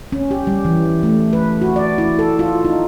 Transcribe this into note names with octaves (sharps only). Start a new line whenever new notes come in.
C#4
G4
G3
E3
A3
B4
F#4
D5
E4
A4
F4
D#4